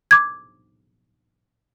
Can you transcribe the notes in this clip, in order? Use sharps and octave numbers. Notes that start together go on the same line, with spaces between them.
D6 G#6